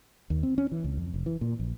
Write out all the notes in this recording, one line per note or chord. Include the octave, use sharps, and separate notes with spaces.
D#2
C4
C#4
E3
C#2
F2
F1
E3
A#2
A#1